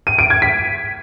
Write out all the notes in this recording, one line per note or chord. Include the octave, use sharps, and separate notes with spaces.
D#7
D7
G#6
B6